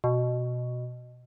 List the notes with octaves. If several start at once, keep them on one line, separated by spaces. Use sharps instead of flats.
B2